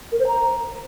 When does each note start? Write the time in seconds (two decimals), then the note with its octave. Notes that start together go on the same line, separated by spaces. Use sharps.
0.12 A#4
0.20 C5
0.27 A#5